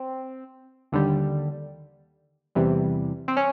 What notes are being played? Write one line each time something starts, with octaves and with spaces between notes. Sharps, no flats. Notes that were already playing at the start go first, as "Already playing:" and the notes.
Already playing: C4
D#2 D3 G3
E2 C3 E3 G3
C4
C#4